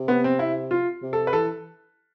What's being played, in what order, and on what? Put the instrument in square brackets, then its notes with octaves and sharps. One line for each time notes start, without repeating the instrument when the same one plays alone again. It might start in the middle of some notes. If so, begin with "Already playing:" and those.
Already playing: [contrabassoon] C3
[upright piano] B3
C4
E4
F4
[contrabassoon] C3
[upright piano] A4
B4
[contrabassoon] E3 [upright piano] A4